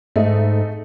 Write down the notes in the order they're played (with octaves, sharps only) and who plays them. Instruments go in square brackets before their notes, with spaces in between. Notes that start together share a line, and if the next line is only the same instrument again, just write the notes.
[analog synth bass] G#2 [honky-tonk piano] A3 D#4